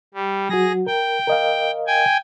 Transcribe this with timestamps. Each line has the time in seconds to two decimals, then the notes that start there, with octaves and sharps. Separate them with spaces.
0.14 G3
0.49 F#3 F#4 G#4 A#6
0.87 A#4 G5
1.27 A#4 D#5 F5
1.87 G5 G#5